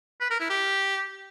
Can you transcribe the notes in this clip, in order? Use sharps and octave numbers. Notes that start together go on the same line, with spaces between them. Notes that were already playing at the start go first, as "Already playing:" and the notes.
B4
A#4
E4
G4